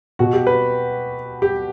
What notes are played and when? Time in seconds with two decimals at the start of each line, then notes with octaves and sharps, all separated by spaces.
0.19 B2 F#4
0.33 G4
0.47 B4
1.42 G4